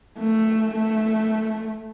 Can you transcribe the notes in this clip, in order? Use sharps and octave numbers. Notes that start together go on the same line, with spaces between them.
A3
A3